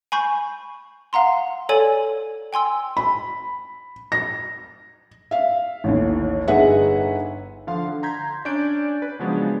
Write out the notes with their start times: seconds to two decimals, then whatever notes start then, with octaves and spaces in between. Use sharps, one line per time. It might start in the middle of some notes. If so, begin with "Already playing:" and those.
0.12 G#5 B5 C#6 G6
1.13 F5 F#5 A#5 C6
1.69 A4 C#5 D5 G#5 D#7 F#7
2.53 G5 G#5 C6 E6
2.97 B5
4.12 A#6
5.31 E5 F5
5.84 A1 D#2
6.48 G1 D#4 G#4 B4 E5 F#5
7.67 D3 F3 F5 C6
7.88 D3
8.03 A#5 C6 G6 G#6 B6
8.45 C#4 D4 D5 C#6 G6 D7
9.02 B4
9.19 C#3 F3 F#3 G#3 B3 D4